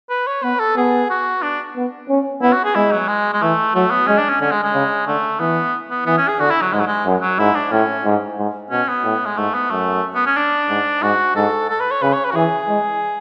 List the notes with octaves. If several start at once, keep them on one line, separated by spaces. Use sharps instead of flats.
B4
C#5
B3 B4
A4
B3 G#4
F#4
D4
B3
C#4
B3 E4
F#4
G#4
G#3 E4
F#3
G#3
G#3
E3 A3
F#3 A3
B3
G#3 C#4
D4
C#4
D3 C#4
G#3
G#3
C#3
D3 A3
E3 B3
B3
E3 B3
C#4
G#4
D3 F#4
E4
F#3
G#2 G#3
F#3
G#3
F#2
F#3
G#2 E4
D4
A2 C#4
G#2
G#2
B2 C#4
B3
A2
G#3
G#2 A3
B3
F#2 A3
B3
C#4
D4
G#2
G#2 F#4
G#2 A4
A4
B4
C#5
C#3 B4
C#5
B4
F#4
E3 G#4
G#3